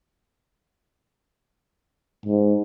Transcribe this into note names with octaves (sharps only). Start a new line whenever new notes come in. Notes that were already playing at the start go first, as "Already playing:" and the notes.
G#2